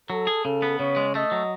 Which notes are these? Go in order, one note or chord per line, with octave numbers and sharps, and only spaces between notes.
F#3 A4
G#4
C#3 A4
B3
C#3 C#5
G#3
A3 D#5
F#3